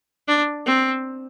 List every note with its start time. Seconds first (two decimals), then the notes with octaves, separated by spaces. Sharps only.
0.28 D4
0.66 C4